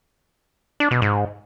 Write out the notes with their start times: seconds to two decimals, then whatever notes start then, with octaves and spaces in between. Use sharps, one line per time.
0.80 D4
0.91 B2
1.02 G#2